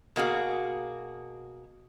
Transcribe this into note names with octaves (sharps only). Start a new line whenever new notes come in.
B2 A#3 F#4 G#4